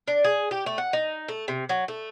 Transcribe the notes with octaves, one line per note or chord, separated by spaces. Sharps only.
D4
G#4
G4
A3
F#5
D#4
A3
C3
F#3
A3